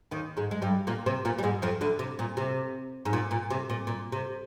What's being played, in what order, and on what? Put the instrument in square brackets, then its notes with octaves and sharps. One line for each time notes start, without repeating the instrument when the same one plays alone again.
[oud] D#2 D#3
G#2 G#3
G#3
G2 G3
A#2 A#3
C3 C4
A#2 A#3
G3
G#2 G#3
F2 F3
D2 D3
C3
A#2
C3
G#2
A#2
A#2
C3
A#2
A#2
C3